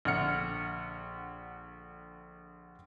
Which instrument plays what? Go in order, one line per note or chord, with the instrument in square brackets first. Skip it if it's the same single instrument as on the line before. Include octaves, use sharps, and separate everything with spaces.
[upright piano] A#1 D3 F#5 F6 C#7